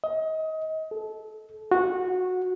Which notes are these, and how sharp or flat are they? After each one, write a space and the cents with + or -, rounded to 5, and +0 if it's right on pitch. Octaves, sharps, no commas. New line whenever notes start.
D#5 +25
A4 -20
F#4 -15